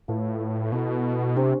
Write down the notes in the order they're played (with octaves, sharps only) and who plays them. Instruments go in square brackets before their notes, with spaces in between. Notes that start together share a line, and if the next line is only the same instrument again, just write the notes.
[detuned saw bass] A2 [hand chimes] F4 B4 F5 A5
[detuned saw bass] B2 [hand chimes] B3 E4 A4
[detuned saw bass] C3 [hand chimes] D4 G4 C5